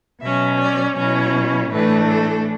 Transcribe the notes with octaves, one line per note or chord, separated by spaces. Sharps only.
B2 F#3 C#4 E5
D5
B2 F#3 C#4 E4 C#5
A2 E3 A3 D4 B4
A4